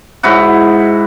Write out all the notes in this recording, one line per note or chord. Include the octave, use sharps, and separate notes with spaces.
G#2 E4 F#4